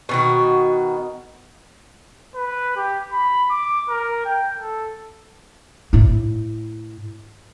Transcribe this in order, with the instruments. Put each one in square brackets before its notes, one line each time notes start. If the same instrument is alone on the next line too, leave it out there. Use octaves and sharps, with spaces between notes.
[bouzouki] B2 D#3 F#4
[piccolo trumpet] B4
G4
B5
D6
A#4
G5
A4
[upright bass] A2 E4